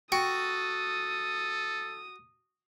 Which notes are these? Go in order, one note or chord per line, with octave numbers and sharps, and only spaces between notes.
F#4 A4 G5 D#6 C#7